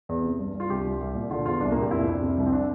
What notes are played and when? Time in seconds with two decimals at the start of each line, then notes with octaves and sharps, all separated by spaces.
0.09 E2
0.23 C3
0.40 G2
0.54 G2
0.60 F4
0.70 C2 G4
0.85 C2
1.01 C2
1.15 A#2
1.31 D3 F4
1.46 E2 F4
1.61 C2 D4
1.72 A#3
1.77 A#2
1.82 G4
1.91 F2 E4
2.07 F2 D4
2.22 C3
2.38 C2
2.46 C4
2.53 D4